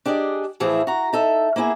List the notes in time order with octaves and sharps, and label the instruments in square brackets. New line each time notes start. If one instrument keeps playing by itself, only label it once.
[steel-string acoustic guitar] D4 G4 G#4 D5 D#5
A2 E3 F3 E4 G#4
F#4 A#5
D#4 A4 E5
A#3 B3 E4 G#4